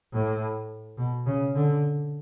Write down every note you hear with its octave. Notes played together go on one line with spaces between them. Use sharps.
A2
B2
C#3
D3